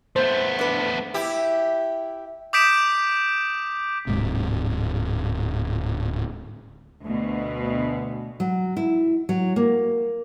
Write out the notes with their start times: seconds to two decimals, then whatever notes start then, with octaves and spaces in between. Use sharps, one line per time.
0.16 A3 B3 C5
0.59 D4 B4
1.14 E4 G4
2.53 D6 D#6 G6 B6 D7 E7
4.07 D1 G#2 C3
7.04 D2 B2
8.40 F#3
8.77 E4
9.29 F#3
9.56 A#3